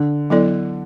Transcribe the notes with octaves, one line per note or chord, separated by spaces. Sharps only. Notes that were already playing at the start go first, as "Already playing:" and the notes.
Already playing: D3
F#3 B3 E4 A4 D5